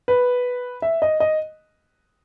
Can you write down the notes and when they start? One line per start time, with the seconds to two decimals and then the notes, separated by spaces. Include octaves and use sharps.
0.08 B4
0.82 E5
1.02 D#5
1.20 D#5